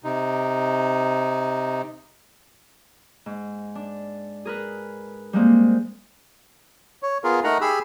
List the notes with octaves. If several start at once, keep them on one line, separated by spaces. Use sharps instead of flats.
C3 D#4
G#2
D4
G#4 A#4 B4
G3 G#3 A#3 C4
C#5
B3 F4 G#4 A#4
A3 D#4 A#4 F#5 A#5
G4 G#4 B5 E6